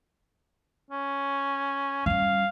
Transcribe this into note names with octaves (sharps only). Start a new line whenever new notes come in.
C#4
G3 C#4 F5